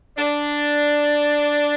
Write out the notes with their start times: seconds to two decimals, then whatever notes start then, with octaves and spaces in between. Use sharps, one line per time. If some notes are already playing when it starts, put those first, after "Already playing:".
0.17 D4